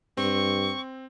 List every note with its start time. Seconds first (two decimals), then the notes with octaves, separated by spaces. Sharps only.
0.17 G2 C4 C#6